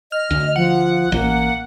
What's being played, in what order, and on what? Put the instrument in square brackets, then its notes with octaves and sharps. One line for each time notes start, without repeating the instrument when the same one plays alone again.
[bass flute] D#5 [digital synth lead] F6
[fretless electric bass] D2
[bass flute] F3 [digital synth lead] F#5
[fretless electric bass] A1 [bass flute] A#3